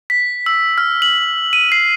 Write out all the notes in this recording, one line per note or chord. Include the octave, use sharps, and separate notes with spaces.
B6
E6
F6
F#7
D#7
C7